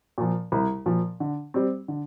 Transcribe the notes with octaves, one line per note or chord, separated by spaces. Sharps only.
A#2 F3
C2
A#2 F3
D3
G3 C4
D3